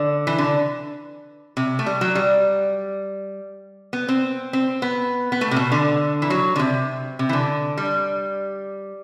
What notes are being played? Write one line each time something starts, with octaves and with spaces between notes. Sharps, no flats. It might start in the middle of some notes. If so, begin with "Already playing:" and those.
Already playing: D3
E3
D3
C3
A3
G3
F#3
G3
B3
C4
C4
B3
B3
A3
C3
B2
D3
E3
F#3
D3
C3
C3
E3
D3
G3